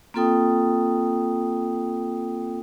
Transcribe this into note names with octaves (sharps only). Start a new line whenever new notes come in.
A#3 C4 F4 A4 G5 D#6